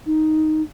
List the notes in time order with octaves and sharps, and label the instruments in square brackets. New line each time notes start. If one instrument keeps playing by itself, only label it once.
[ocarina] D#4